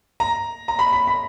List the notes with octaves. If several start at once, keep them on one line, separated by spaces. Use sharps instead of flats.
A#5
A#5
B5
B5
B5